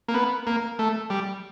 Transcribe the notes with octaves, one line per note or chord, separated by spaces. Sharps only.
A#3
B3
A#3
A3
G3